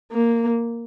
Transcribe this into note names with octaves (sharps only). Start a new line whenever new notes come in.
A#3